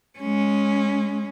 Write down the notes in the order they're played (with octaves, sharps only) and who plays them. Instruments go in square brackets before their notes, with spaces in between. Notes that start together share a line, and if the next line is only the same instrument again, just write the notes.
[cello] G#3 C#4